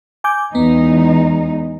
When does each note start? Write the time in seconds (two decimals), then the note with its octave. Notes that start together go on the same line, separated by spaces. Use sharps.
0.24 G#5 D6 G6
0.55 E2 G#3 B3 D#4